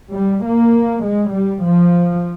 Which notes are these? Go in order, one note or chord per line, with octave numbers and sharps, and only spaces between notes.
G3
A#3
G#3
G3
F3